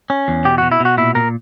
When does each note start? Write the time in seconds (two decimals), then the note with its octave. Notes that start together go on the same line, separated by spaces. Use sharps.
0.10 C#4
0.28 E2
0.45 B2 G4
0.58 B2 F#4
0.72 E4
0.80 B2 F#4
0.98 A#2 E4
1.15 A#2 A#4